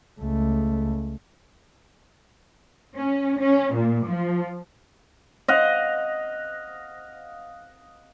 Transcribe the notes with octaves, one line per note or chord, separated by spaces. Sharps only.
C#2 A3
C#4
C#4
A#2
F3
D#5 F5 F#5